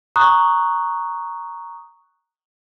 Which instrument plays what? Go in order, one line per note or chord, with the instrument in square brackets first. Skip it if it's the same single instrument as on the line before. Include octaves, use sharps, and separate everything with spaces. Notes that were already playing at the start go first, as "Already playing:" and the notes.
[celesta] A#5 C#6 D#6 F#6